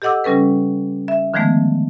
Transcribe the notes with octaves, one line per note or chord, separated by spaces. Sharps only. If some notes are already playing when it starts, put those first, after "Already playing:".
G4 A4 D#5 F#5 D6 E6
C#3 G3 C#4 A4 B4
E5
D3 D#3 F3 G#3 A3 B3